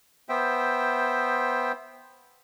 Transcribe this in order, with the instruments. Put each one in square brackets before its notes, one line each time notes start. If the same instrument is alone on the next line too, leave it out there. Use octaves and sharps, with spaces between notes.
[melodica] B3 C5 E5 G5